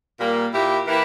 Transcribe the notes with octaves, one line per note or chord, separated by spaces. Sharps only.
A#2 G3 A#3
A#2 A#3 E4 G4
E3 A#3 E4 G4 B4